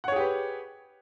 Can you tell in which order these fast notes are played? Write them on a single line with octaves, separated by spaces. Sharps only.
F#5 C#5 G#4 G4 B4